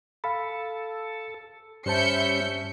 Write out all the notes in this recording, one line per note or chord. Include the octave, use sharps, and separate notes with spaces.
A4 F5 B5
G2 G3 C#4 C5 E5 A5 G6 C#7